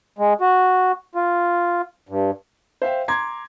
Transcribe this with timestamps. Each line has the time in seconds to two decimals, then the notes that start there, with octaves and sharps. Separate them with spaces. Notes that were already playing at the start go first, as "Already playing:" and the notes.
0.18 G#3
0.41 F#4
1.15 F4
2.09 G2
2.82 C5 E5 F5 G5
3.08 A#5 C6 D6 G#6